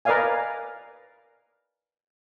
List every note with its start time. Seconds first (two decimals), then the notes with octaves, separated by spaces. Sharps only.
0.05 A#4 B4 D5 D#5 F5 G#5